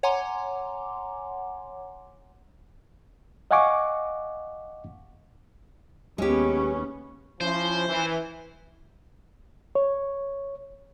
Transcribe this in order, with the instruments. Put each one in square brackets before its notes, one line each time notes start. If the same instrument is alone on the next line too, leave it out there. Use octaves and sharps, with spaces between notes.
[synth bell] C#5 F#5 G#5 A#5 C6 D6
[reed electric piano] D#5 F5 F#5 G#5 C#6 D6
[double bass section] D#2 B3 C#4 [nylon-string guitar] G#3 G4
[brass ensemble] F3 C#4 E4 [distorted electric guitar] C5
[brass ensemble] E3
[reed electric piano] C#5